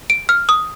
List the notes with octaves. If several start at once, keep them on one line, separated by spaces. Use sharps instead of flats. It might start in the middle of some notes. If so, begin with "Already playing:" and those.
D7
F6
D#6